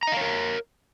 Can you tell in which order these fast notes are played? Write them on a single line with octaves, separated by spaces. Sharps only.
A#5 D#5 F5 C#5 A#4